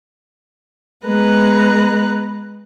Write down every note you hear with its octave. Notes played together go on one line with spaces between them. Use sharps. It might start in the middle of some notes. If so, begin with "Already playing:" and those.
G#3 B3 B4 A#5 F#6